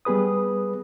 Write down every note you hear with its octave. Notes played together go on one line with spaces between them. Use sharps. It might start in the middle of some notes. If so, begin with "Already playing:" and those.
G3 B3 G#4 B4 D#6